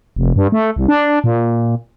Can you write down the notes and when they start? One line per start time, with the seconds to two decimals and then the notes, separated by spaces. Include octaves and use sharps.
0.16 F1
0.36 G2
0.52 A3
0.76 C2
0.88 D4
1.24 A#2